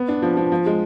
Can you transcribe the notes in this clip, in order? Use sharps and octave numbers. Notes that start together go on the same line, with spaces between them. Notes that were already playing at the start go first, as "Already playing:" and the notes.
Already playing: B3
D4
F3
F3
F3
G#3